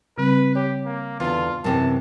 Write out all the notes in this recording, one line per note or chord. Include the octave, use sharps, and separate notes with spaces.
C#3 G3 C4 B4
G4 C#5
A#3
E2 D3 F4 D5
F#2 C3 E3 A5